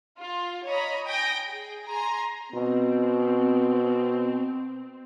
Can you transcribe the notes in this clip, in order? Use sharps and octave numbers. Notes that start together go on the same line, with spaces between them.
F4
C#5 D#5 A#5 B5
G5 G#5 D#6 G6 A#6 D7
G#4
G#5 A#5 C6
B2 C4